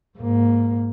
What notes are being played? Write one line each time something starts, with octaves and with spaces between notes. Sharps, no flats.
G#2 A#3